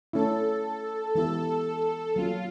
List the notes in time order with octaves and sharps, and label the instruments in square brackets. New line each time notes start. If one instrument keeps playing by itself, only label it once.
[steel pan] A3 C#4 E4 [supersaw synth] A4
[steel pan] E3 G#3 B3 E4 G4 [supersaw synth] A4
[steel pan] F#3 A#3 C#4 [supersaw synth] F4